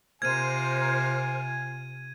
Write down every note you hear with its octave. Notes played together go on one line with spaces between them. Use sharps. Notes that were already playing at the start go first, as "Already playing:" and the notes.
C3 F4 A#4 C5 G#5 F6 G#6 D#7